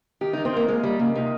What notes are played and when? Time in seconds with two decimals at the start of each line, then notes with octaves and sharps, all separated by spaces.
0.21 D#3 G4
0.33 D#3 D#4
0.45 C4
0.53 A#3 F4
0.68 G#3 A#3
0.83 D#3 G3
0.99 C#3 A#3
1.15 C3 D#4